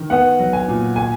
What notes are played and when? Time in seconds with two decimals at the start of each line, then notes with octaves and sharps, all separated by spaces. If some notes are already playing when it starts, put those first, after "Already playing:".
Already playing: D#3
0.10 B3 F#5
0.39 F#3
0.53 G#5
0.68 A#2
0.96 G#5